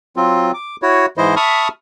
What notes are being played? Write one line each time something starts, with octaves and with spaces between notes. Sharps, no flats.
F#3 C4 F4
D6
E4 F#4 C#5
G#2 E3 E4 C5 D#5
E5 A5 B5 C#6 D#6 F6